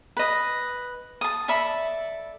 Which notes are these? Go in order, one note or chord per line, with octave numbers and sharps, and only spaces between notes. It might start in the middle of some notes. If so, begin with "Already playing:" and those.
B4 D#5
A5 D#6
A4 D5 E5 B5